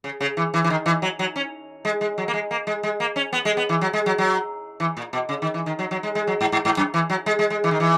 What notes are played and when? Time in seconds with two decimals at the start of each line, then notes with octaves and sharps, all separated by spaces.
0.04 C#3
0.21 C#3
0.37 E3
0.54 E3
0.64 E3
0.70 D#3
0.86 E3
1.02 F#3
1.19 F#3
1.36 C#4
1.85 G#3
2.01 G#3
2.18 F#3
2.28 A#3
2.34 G#3
2.51 A#3
2.67 G#3
2.83 G#3
3.00 A#3
3.16 C#4
3.33 B3
3.45 G#3
3.57 B3
3.69 E3
3.81 F#3
3.93 G#3
4.06 F#3
4.18 F#3
4.80 E3
4.97 A#2
5.13 B2
5.29 C#3
5.42 D#3
5.54 E3
5.66 D#3
5.79 F#3
5.91 F#3
6.03 G#3
6.15 G#3
6.27 F#3
6.41 G#2
6.52 G#2
6.65 G#2
6.77 F#2
6.94 E3
7.10 F#3
7.26 G#3
7.39 G#3
7.50 G#3
7.64 E3
7.71 D#3
7.80 E3